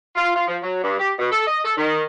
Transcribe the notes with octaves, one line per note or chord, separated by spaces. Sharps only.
F4
F4
F3
F#3
G2
G4
B2
A4
D#5
A4
D#3